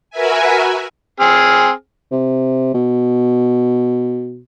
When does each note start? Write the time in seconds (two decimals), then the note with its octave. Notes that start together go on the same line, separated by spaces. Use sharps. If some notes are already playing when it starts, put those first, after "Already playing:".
0.10 F#4 A#4 B4 E5 G#5
1.20 C4 G#4 F6
2.12 C3
2.74 B2